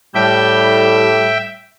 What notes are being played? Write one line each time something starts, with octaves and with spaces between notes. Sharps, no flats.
A2 G3 E5 G5